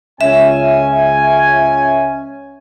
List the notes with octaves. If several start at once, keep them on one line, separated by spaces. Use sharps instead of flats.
C#2 C#4 E5 G#5